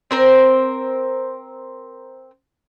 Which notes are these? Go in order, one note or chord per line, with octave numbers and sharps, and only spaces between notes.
C4 A#4 C5